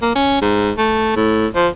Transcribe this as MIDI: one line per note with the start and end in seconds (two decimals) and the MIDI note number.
0.02 0.13 58
0.16 0.42 61
0.42 0.71 44
0.78 1.16 57
1.16 1.47 45
1.55 1.68 53